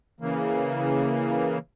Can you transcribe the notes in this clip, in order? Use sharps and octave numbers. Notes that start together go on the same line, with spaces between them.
C#3 E3 A#3